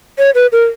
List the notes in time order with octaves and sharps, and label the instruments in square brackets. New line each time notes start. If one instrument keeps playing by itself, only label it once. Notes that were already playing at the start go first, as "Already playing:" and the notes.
[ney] C#5
B4
A#4